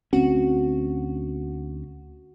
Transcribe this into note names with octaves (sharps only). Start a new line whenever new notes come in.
D2 C4 C#4 F#4